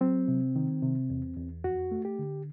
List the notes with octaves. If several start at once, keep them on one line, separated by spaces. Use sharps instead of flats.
F#3 C4
C3
D#3
C3
E2
E2
F2 F#4
A3
G4
D3